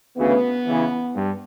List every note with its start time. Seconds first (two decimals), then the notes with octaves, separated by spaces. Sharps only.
0.17 D2 C#3 E3 B3
0.66 E2 C#3 E3
1.14 G2